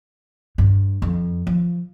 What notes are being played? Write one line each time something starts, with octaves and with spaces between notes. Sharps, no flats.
G2
F2
F3